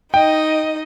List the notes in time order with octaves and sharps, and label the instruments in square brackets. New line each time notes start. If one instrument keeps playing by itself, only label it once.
[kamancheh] D#4 D#5 [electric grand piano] G5